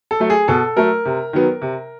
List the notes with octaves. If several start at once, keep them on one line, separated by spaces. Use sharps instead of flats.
A4
F#3 A3
G#4
B2 A4
F#3 A3 A#4
C3
D#3 F#3 B3
C3